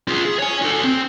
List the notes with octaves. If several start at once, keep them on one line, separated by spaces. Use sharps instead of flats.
F4 G#4
G#4
C#5 G#5
F#4 A4
C4